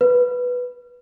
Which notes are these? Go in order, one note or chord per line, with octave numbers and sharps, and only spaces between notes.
B4